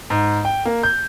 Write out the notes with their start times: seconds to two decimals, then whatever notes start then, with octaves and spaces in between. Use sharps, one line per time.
0.10 G#2
0.45 G5
0.65 A#3
0.83 G6